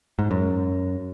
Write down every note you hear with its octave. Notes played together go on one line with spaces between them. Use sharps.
G#2
F#2